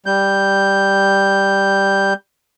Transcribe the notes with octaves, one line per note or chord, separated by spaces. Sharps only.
G3 G6